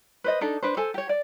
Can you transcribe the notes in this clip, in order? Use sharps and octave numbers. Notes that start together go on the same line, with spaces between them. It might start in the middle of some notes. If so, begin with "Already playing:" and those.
B4 C5 D#5
D4 D#4 A4
D4 B4 C5
A4 C5 G#5
G4 C#5
D5